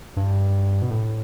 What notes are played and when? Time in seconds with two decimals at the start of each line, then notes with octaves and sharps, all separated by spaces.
0.17 G2
0.82 B2
0.90 A2